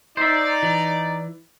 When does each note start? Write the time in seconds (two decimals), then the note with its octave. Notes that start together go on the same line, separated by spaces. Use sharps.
0.17 D#4 C5 D5 E5
0.63 E3